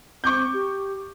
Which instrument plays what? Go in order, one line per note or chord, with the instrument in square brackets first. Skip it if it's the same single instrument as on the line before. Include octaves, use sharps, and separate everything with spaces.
[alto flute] C4 [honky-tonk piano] C#6 D6 G6
[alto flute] G4